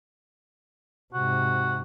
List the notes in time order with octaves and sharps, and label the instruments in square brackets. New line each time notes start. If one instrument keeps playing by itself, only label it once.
[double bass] G#2 C3 [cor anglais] F#4